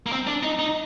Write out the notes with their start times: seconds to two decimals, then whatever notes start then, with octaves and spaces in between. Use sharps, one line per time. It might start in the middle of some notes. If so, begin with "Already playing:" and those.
0.06 A#3
0.12 C4
0.27 D4
0.43 D#4
0.59 D#4